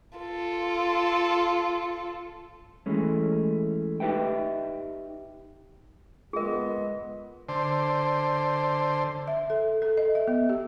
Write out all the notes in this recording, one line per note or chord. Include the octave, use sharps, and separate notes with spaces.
F4 A4
E3 G#3 A3 C#4
D#4 G4 B4 E5 G5
G#3 B3 F4 G#4 A#4 D#5
D3 C5
E5
A4
A4
D#5
E5
B3
G4